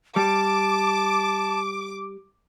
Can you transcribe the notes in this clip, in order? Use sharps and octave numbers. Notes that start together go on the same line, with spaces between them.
G3 A5 D6